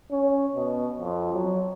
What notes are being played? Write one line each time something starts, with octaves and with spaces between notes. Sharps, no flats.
C#4
B2
F2
F#3